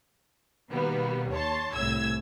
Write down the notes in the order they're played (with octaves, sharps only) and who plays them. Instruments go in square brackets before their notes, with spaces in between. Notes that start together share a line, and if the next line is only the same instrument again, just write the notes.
[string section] B2 D#3 G3 A#3 B3
D#2 C#5 A5 C6
C2 A2 E6 G#6